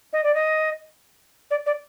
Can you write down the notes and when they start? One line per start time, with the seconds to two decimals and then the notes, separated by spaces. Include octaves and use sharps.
0.13 D#5
0.24 D5
0.35 D#5
1.51 D5
1.66 D5